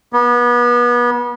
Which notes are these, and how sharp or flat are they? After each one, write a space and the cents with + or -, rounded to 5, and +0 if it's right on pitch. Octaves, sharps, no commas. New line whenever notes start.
B3 -30